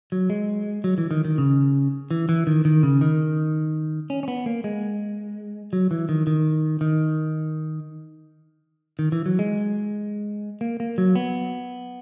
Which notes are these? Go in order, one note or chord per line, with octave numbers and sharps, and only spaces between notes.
F#3
G#3
F#3
E3
D#3
D#3
C#3
E3
E3
D#3
D#3
C#3
D#3
C#4
C#4
B3
A#3
G#3
F#3
E3
D#3
D#3
D#3
D#3
E3
F#3
G#3
A#3
A#3
F#3
B3